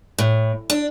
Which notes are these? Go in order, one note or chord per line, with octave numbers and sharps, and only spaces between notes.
A2
D4